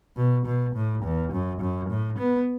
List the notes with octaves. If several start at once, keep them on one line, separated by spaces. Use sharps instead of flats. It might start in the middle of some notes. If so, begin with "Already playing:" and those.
B2
B2
A2
E2
F#2
F#2
A2
B3